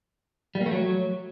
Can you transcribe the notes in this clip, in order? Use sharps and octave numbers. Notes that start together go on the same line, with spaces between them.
G3
A#3
A3
F#3